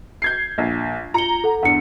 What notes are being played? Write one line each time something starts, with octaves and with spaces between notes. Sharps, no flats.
G6 G#6 C7
A#1
F4 A#5 C#7 G7
A4 F#5
E2 D3 F#5 C#7